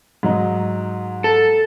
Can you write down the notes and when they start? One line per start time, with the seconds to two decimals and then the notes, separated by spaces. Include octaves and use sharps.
0.23 G#2 F#3 D#4
1.24 A4